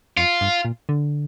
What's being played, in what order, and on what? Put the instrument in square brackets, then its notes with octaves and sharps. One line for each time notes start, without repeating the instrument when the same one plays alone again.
[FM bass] F2 [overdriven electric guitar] F4
[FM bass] G2
A#2
D3